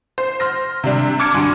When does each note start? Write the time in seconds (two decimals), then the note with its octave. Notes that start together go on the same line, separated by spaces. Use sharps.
0.18 C5
0.40 C6 F6 A#6
0.84 C3 G3 D4
1.19 A5 D6 F6 G#6 C#7 D7
1.34 G2 D3 F#4 G#5 C6